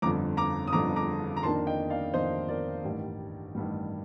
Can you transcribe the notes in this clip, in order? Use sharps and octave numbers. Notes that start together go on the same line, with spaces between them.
G1 F2 D3 A#5 D6
A#5 D6
D#6
G1 F2 D3 A#5 D6
A#5 D6
A#5
F2 D#3 A#3 D4 A5 C6
D#5 G5
D5 F5
F2 D#3 A#3 D4 C5 D#5
A#4 D5
A1 G2 D#3 G3
A1 G2 D#3 G3